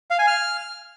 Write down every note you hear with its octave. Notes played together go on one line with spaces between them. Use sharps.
F5
G#5
F6